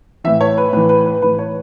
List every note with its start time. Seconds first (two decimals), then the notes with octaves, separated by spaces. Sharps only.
0.24 A2 E3 E5
0.41 C#5
0.58 B4
0.73 A2 E3 B4
0.89 B4
1.06 B4
1.22 A2 E3 B4
1.39 C#5